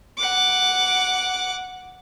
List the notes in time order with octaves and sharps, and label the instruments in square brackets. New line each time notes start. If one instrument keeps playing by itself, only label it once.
[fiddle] F#5 D6